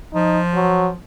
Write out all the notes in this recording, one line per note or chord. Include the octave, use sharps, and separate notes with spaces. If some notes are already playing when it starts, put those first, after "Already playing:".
F3 D#4
F#3